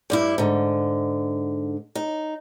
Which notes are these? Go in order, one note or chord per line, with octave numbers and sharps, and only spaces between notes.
G2 G3 E4
G#2 D3
D#4